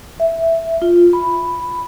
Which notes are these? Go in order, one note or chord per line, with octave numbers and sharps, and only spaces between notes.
E5
F4
B5